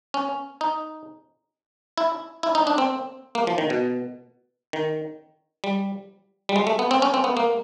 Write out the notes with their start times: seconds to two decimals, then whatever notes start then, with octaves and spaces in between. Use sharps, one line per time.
0.14 C#4
0.61 D#4
1.98 E4
2.43 E4
2.55 D#4
2.67 D4
2.78 C4
3.35 A#3
3.47 F3
3.58 D#3
3.70 B2
4.73 D#3
5.64 G3
6.49 G3
6.56 G#3
6.67 A3
6.79 B3
6.91 C4
7.02 C#4
7.14 C4
7.24 B3
7.37 A#3